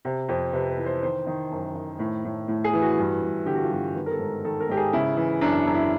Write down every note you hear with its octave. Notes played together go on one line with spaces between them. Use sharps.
C3
F2
C3 B4
B4
E3
C5
D#3 C5
D#3
F#2
D#3
A2
A2
A2
G#4
E3
F#4
G2
G2
D3 G4
F#4
F4
G2 F#4
D#3 B4
A#4
A4
G#2
D#3 A4
A#4
G#2 G4
G#4
C#3 E4
E3
F#2 D4
F#2
E4